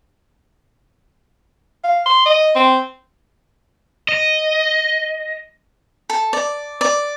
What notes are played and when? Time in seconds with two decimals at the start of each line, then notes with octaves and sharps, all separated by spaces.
1.84 F5
2.06 C6
2.26 D#5
2.55 C4
4.09 D#5
6.10 A4
6.33 D5
6.81 D5